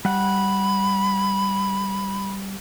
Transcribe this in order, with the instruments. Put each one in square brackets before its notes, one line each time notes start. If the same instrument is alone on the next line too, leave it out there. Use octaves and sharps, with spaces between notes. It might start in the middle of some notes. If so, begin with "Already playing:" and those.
[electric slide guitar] G3 F#5 [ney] B5